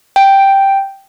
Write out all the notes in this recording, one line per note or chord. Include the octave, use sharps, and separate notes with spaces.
G5